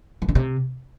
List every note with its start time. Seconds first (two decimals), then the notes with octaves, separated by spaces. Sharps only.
0.22 E3
0.29 D3
0.35 C3